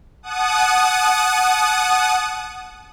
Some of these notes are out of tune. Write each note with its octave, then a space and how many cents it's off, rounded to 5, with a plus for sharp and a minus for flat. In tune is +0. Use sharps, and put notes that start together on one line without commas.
F#5 +0 A5 -40 D#6 -15